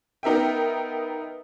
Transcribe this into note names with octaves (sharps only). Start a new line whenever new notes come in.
B3 D#4 A#4 E5 G5